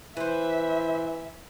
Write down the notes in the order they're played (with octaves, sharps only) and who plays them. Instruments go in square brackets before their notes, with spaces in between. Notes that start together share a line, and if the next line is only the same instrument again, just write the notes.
[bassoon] E3 [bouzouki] B4 C5 [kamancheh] E5